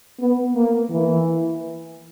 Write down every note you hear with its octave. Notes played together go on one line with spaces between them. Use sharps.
B3
A#3
E3